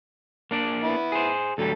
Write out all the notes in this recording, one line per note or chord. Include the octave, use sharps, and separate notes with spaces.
A#3 D4 D5
B3 E4
G#4 C5
D2 F#3 G3 A4